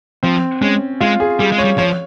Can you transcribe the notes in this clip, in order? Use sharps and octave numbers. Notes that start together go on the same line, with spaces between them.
F3 C4
G#3 C#4
G#3 F4
G#4
G3 G#4
G#3
C#5
G3
F3 C#5